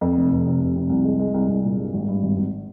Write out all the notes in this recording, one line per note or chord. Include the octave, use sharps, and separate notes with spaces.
F2
F1
F1
C3
F1
C3
C2
G#3
G#3
C2
C2
A#2
G2
G#1
G2
G#1
G#1